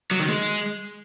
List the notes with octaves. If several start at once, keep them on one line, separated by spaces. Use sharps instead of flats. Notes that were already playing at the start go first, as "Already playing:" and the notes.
F#3
D#3
G#3